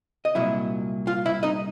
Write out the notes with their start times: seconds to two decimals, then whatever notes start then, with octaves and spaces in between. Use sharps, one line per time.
0.25 D#5
0.35 C2 A#2 F#3 E4 E5
1.07 F4 F5
1.26 E4 E5
1.43 D#4 D#5